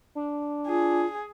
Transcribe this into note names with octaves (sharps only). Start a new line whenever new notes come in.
D4
F4 G#4